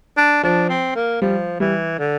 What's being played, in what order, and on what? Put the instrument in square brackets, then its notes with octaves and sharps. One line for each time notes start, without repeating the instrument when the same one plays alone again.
[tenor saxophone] D4
[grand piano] F3 [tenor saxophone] D4
[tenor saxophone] C4
A#3
[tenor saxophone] F3 [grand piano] G3
[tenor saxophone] E3 [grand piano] G3
[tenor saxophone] D3